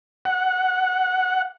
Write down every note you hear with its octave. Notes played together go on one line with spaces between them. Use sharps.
F#5